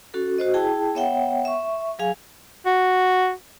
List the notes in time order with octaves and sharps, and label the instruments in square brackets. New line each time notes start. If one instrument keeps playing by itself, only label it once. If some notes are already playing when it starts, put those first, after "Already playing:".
[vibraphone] C#4 F#4 A4
F#4 C5 D#5
E4 G#4 G5 A5
B3 C#5 E5 F#5 G5
E5 C#6
F#3 G#4 F5 G#5
[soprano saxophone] F#4